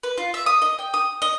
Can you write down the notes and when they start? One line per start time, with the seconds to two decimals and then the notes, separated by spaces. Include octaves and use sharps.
0.03 B4
0.18 F4
0.34 E5
0.46 D#6
0.62 D#5
0.79 G5
0.94 D#6
1.22 D#5